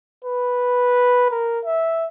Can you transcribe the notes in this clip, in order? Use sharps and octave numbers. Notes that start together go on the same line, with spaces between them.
B4
A#4
E5